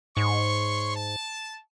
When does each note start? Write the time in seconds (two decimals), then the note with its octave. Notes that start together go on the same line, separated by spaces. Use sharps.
0.17 G#2 C#5 C6 C#6
0.96 A5